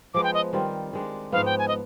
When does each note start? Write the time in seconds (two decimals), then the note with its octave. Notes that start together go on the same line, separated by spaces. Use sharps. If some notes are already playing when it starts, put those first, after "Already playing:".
0.14 F3 G#3 B3 D6
0.24 G5
0.34 D#5
0.53 D#3 G3 C4 F4
0.93 D#3 G#3 D4
1.32 G#2 F3 B3 F5
1.46 G5
1.59 G#5
1.68 D#5